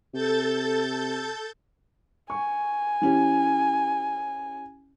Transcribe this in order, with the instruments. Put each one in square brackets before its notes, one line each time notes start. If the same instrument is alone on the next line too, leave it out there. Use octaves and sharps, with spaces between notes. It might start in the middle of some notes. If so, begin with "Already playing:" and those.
[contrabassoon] C3 [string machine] A4 G6 A6
[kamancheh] G#5 [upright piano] C#6
[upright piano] E3 C#4 G4